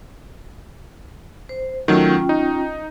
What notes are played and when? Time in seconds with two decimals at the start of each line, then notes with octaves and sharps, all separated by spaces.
1.49 C5
1.88 D#3 F#3 A3 C#4 F4 G5
2.29 D#4